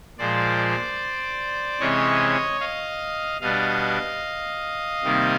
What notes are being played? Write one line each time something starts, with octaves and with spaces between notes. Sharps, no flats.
A#2 F3 G#3 C5 D5
C3 E3 G#3 C#4 C#5 D#5
D#5 F5
B2 G3 B3 D4 D#5 F5
C3 D#3 G3 A#3